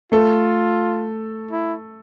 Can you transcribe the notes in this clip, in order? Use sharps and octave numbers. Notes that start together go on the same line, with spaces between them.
A3 F4 A4
E4